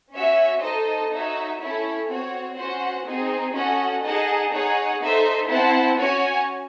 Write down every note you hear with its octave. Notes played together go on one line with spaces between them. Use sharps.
C#4 F#4 C#5 E5
D#4 A4 C5 D#5 A5
D#4 F#4 C#5 E5
C#4 E4 A4 C#5
C4 F#4 C#5
C#4 F#4 C5 F#5
C4 D#4 G#4
C#4 F#4 A4 D#5 F#5
D#4 G#4 D#5 F#5 A5
D#4 G#4 C#5 F#5
D#4 A4 C5 E5
C4 E4 C5 F#5 A5
C#4 F#4 C#5 G#5